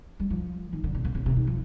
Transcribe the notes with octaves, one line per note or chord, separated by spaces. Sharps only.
G3
F3
D#3
D3
C3
C3
C3
C3
D#3
F3